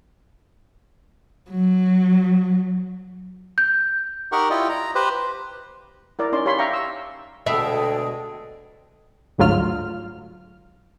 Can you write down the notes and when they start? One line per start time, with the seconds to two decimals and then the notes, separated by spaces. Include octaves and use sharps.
1.51 F#3
3.58 G6
4.32 D#4 G4 A#4 F#5 C#6
4.50 E4 F4 G4 D5 D#5 G5
4.69 A#5
4.95 G4 B4 C5
6.19 E4 A#4 D5
6.32 C#4 D#4 D5 C6
6.46 G4 C#5 F5 B5 C6
6.58 E5 F5 G5 A#5 C#6
6.73 C#6 E6
7.46 D2 B2 G#3 A4 E5 G5 D#6
9.38 G1 D2 G#2 F#3 F4 F6